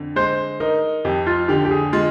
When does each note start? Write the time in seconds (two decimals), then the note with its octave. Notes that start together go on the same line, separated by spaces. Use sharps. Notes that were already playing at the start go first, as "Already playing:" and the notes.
Already playing: F2 D3
0.16 G#3 C5
0.60 D#4 A#4
1.05 F2 G4
1.26 F4
1.48 D3 G4
1.65 G4
1.71 G#4
1.93 G#3 F4